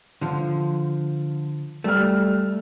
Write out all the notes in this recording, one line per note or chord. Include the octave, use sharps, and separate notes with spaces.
D3 F3
G3 A3 F6